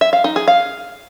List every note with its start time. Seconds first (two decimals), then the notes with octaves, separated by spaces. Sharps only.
0.01 E5
0.13 F5
0.24 D#4
0.36 G#4
0.48 F5